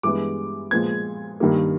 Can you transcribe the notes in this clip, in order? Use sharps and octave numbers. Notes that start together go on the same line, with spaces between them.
G2 E3 G#3 B3 D6
A#2 F3 G#3 B3 G#6
G2 D#3 G3 A#3